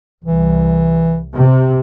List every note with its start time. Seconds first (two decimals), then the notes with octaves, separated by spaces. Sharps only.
0.24 C2 E3
1.37 C3